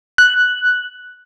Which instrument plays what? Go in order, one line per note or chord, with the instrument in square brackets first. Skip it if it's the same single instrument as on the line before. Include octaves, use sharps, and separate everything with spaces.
[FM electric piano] F#6